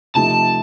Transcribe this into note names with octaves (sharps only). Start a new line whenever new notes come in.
C3 F3 A3 D#4 A5